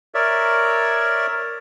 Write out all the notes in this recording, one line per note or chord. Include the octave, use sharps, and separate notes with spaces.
A#4 C#5 D5 E5